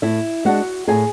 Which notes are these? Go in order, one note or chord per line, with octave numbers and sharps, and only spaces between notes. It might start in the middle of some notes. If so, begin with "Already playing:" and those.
A2 E4 E5
G#3 D4 F#4 F#5
A2 G#4 G#5